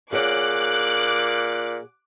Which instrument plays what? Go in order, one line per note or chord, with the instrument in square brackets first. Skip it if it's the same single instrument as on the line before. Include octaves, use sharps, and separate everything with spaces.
[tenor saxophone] A#2 [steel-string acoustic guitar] G#4 C#5 F#5 [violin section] D6 F#6